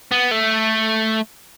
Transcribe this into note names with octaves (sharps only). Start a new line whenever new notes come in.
B3
A3